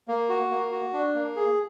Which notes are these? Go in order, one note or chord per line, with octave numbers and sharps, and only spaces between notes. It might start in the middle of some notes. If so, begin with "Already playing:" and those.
A#3
F#4
A#3
F#4
D4
A#3
G#4